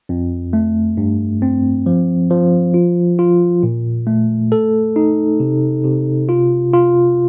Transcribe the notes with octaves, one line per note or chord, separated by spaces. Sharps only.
F2
A3
G2
C4
F3
F3
F4
F4
A#2
A3
A4
D#4
C3
C3
F4
F4